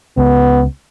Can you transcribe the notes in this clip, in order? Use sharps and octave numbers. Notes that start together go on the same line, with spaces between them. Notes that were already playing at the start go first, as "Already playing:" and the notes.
C#2 B3